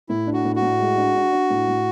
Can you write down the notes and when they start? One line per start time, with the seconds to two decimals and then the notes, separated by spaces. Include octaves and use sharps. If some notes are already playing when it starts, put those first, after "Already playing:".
0.09 A2 E4
0.27 D4
0.33 F#4
0.45 A2
0.56 F#4
0.62 A2
0.79 G#3
0.98 D4
1.15 D4
1.32 D4
1.50 A2
1.67 A2